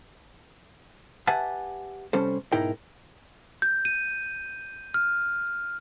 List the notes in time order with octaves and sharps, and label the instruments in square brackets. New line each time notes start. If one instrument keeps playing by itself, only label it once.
[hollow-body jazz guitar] G4 B4 E5 F#5 G#5 A5
C2 G3 C#4 A4 C5
B1 G#2 D#4 E4 A#4 G5
[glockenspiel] G6
D#7
F6